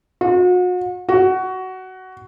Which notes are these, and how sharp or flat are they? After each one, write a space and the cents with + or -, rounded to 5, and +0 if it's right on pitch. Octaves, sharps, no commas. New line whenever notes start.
F#4 -40
F#4 +15